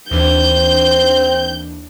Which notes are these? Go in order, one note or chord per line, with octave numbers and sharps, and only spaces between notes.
D#2 E3 C4 D4 G6